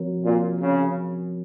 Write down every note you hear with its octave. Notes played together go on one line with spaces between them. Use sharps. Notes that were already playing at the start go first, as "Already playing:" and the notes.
Already playing: F3 C4 F#4 A#4 C#5
A#2
C#3